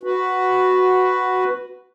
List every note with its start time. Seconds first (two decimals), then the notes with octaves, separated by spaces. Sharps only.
0.03 F#4 B4